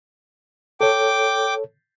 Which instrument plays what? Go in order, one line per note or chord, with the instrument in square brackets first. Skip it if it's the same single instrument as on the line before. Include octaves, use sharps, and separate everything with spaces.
[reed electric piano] A4 C#5 [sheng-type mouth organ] G5 D6